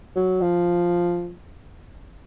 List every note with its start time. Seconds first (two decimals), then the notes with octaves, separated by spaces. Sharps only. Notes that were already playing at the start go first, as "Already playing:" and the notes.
0.16 F#3
0.41 F3